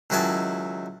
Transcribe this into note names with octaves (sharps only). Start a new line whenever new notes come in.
C#2 D#3 F#3 E4 G#5 A5